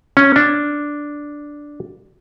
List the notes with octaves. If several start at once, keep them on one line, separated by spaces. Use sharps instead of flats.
C#4
D4